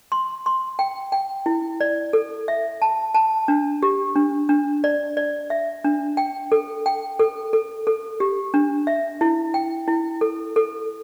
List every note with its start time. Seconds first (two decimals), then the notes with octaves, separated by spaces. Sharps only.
0.12 C6
0.46 C6
0.79 G5
1.12 G5
1.46 E4
1.81 D5
2.13 A4
2.48 E5
2.82 A5
3.15 A5
3.48 D4
3.83 G4
4.16 D4
4.49 D4
4.84 D5
5.17 D5
5.50 E5
5.84 D4
6.17 G5
6.52 A4
6.86 G5
7.19 A4
7.53 A4
7.87 A4
8.20 G4
8.54 D4
8.87 E5
9.21 E4
9.54 G5
9.88 E4
10.21 A4
10.56 A4